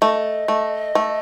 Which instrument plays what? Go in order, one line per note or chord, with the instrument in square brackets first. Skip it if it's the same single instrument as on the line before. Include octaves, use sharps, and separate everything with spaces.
[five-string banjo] A3 [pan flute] D#5
[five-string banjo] A3
A3